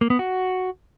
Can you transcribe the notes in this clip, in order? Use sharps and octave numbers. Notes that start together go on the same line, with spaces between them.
A#3
B3
F#4